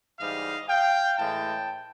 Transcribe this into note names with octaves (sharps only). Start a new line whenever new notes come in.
G#2 E3 G3 D#5 F5
F5 G5
A2 E3 G#3 G5 A5